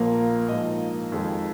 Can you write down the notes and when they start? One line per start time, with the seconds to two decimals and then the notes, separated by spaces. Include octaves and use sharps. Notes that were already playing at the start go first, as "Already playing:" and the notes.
Already playing: A#1 A#2 F3 A#3
0.48 A#1 G#2 F3 A#3 D#5
1.12 F2 D#3 G#3